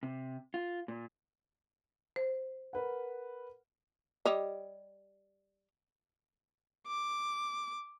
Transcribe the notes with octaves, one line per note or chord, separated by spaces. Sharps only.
C3
F4
A#2
C5
A#4 B4 F#5
G3 C#5 D#5
D6